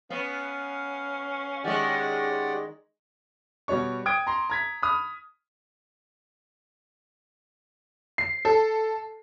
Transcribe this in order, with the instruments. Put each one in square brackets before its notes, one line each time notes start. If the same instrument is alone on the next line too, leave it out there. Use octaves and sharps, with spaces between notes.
[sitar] B3 [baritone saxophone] C#4 [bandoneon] F5
[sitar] D#3 G#3 [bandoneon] G4 D5 F#5
[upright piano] B2 G3 F#4 C#5 C#6
G5 D#6 G#6 D7
A#5 C6
A#5 G#6 B6
B5 D#6 F6
[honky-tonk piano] C7
A4